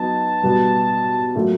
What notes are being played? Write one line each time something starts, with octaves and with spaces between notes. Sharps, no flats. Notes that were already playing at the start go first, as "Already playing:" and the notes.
Already playing: F#3 B3 D#4 A5
B2 G3 B3
A#2 F#3 A3